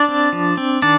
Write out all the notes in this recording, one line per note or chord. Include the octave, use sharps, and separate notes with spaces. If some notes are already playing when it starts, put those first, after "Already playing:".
Already playing: D4 D5
C4
F3
C4
D#3 D4 D5